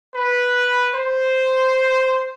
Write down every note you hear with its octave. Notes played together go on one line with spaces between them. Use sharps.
B4
C5